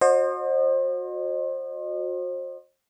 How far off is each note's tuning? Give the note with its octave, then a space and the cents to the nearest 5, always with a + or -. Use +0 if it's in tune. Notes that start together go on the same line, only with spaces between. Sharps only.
F#4 -30 C5 +30 D#5 -35